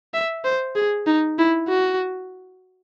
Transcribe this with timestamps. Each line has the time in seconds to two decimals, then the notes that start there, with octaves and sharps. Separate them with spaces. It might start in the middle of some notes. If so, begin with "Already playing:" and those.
0.14 E5
0.45 C5
0.76 G#4
1.07 D#4
1.38 E4
1.69 F#4